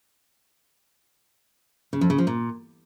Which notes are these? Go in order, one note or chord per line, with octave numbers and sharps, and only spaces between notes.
C#3
F2
C#3
F3
A#2